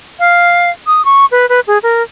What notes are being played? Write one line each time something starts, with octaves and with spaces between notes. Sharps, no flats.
F5
D#6
C#6
B4
B4
G#4
A#4